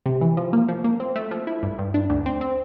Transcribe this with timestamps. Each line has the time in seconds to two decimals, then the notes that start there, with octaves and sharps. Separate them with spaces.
0.06 C3
0.21 E3
0.37 F3
0.53 A#3
0.69 F3
0.84 A#3
1.00 C4
1.16 A3
1.31 F3
1.47 E4
1.63 G2
1.78 G2
1.94 D4
2.10 D2
2.26 C4
2.41 C4